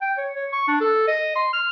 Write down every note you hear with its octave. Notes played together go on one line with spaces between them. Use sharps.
G5
C#5
C#5
C#6
D4
A4
D#5
C6
F6